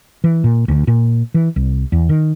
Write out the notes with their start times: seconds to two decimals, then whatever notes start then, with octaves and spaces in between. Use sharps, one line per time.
0.24 E3
0.44 A#2
0.68 D2
0.87 A#2
1.34 E3
1.56 C2
1.92 E2
2.09 D#3